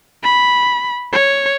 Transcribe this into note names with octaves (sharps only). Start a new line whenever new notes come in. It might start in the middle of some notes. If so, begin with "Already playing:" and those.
B5
C#5